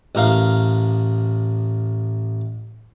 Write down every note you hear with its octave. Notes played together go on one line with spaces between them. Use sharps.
A1 A2 A#4 F5